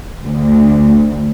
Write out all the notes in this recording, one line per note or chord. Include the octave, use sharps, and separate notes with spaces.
D2